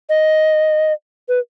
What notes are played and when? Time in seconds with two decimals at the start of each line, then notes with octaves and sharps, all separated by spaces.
0.09 D#5
1.28 B4